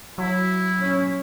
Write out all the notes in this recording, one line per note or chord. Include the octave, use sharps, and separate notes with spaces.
F#3 E4
C#4